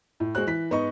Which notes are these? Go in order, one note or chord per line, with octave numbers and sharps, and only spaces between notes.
A2
G#3 F#4 C5 F#6
E3 B6
G#2 B3 D#4 D#5 C#6